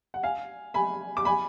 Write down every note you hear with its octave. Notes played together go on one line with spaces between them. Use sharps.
F#5
F5 G#5
G#5 B5
D6
G#5 B5